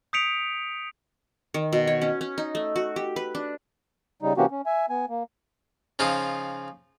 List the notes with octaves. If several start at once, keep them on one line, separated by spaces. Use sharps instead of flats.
D#6 G6 B6 C#7 D7 F7
D#3
B2
C#5
C#4
C#4
D#4
A3
F#4
G4
B4
D4
C#3 G3 D#4
C3 E3 A#3 C#4 F#4 G4
C#4
E5 G#5
B3 G#5
A#3
C#3 F3 D#4 F4